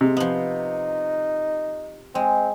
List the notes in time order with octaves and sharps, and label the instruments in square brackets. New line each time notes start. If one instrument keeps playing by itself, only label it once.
[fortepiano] C3 [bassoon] G#3
[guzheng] F3 B3 [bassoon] D#4
[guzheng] G#3 [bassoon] C4